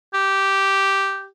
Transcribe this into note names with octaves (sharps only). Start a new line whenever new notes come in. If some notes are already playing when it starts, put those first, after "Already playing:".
G4